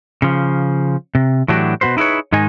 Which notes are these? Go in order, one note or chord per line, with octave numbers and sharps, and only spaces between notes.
C#3 F3
C3
A2 E3 F#3 D4 F#4 G4
B2 E3 F#4 B4 C5
D#4 E4 G#4 B4 C#5
G#2 D#3 G#3 D#4 G#5